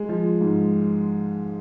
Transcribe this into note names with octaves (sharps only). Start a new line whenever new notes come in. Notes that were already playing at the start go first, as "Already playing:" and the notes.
Already playing: G#3
F3
G#2